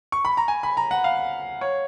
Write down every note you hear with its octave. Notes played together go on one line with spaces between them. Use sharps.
C#6
B5
A#5
G#5
B5
A#5
F#5
F5
C#5